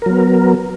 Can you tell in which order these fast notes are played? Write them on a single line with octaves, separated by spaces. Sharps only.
A#4 F#3 B3